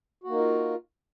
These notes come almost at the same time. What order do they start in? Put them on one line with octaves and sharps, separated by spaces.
F#4 A#3 D#4 A#4 F4